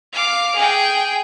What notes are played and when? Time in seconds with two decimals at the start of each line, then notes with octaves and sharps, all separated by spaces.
0.13 F5 D6
0.55 G#4 G5